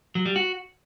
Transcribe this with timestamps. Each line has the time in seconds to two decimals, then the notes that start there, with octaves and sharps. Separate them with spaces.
0.15 F#3
0.26 G3
0.36 F#4